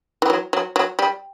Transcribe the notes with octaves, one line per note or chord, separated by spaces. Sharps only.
E3
F#3
F#3
F#3
G3